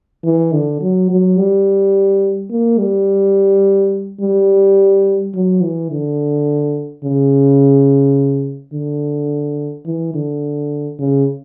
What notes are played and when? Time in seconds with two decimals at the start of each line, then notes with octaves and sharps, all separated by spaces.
0.24 E3
0.53 D3
0.82 F#3
1.10 F#3
1.38 G3
2.51 A#3
2.79 G3
4.21 G3
5.35 F#3
5.62 E3
5.91 D3
7.04 C#3
8.74 D3
9.86 E3
10.14 D3
10.99 C#3